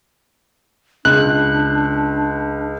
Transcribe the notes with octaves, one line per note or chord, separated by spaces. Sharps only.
C#2 D4 F#6